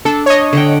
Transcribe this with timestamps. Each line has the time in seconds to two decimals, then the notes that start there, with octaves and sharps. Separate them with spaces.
0.05 D4 A4
0.26 C#5 D#5
0.53 D3 F#5 G5